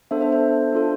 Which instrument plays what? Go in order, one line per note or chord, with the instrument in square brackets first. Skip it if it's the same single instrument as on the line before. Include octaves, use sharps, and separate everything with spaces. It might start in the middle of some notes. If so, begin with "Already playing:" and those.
[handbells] B3 D4 A4 C5 E5
C5 E5
C5 E5
D4 F4 A4